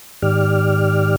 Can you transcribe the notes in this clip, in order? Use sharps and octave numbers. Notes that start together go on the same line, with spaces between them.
G#2 D#3 G4 D5 F6